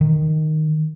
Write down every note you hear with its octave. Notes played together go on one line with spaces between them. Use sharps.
D#3